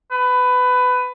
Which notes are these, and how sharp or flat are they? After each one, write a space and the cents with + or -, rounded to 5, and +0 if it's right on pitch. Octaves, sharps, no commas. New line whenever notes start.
B4 +15